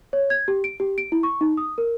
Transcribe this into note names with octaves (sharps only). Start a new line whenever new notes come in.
C#5
G#6
G4
D7
G4
D7
E4
C#6
D#4
D#6
A#4